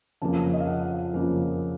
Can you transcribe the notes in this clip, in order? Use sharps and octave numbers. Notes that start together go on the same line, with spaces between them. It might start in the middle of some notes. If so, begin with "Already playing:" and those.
F2 C#3 F3 A#3 A5
D#5
F5
F#5
F2 C#3 F3 A#3